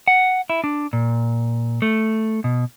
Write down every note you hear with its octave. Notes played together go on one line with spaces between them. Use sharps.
F#5
E4
D4
A#2
A3
B2